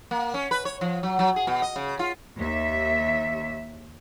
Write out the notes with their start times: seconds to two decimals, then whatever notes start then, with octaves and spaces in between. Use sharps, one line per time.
0.11 A#3
0.34 C#4
0.51 B4
0.65 C#5
0.81 F3
1.03 F#3
1.19 F#3
1.36 G#4
1.47 B2
1.62 D#5
1.76 C#3
1.99 F4
2.38 D#2 E5